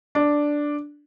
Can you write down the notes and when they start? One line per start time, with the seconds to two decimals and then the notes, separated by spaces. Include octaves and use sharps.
0.15 D4